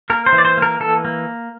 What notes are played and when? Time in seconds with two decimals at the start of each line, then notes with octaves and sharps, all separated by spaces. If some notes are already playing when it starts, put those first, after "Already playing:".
0.10 A#3 A#4
0.26 C5
0.32 E3
0.38 D5
0.45 C5
0.57 A#3
0.62 A#4
0.80 E3 A4
1.05 A#3